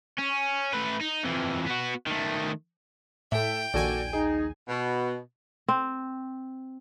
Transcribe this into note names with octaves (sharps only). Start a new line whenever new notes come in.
C#4
A3 B4
D#4
F2 E3
B3 F#4
D#3 A3
A2 A4 E5 G5
A#1 D#2 F#4 A4 D5 G#5
D#4 G#4
B2
C4